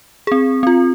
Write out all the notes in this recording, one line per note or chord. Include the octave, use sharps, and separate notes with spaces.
C4 G#4
C4 F4